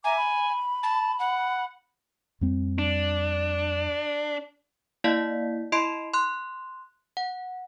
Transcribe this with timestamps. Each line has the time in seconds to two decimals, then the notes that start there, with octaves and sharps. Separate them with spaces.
0.04 E5 G#5 A#5 D6
0.16 B5
0.83 A5
1.19 F#5
2.41 F2 G3 C4
2.79 D4
5.04 A#3 E4 D5 D#5 F5 B6
5.72 E4 D#5 B5 C6 C7 D7
6.14 C6 F#6
7.17 F#5